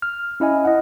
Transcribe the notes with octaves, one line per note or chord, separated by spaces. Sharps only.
F6
C#4 E4 D#5 G#5
D#5 F#5